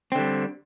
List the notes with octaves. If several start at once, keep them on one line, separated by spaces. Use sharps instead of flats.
D3 G3 C4